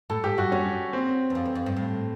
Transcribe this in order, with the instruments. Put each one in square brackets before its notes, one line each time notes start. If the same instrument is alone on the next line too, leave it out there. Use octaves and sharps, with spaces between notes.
[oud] A2 [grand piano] A4
[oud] G#2 [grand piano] G4
[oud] G2 [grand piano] F#4
[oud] F#2 [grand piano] C#4
[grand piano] C4
[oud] E2
F2
E2
F2
G2
A2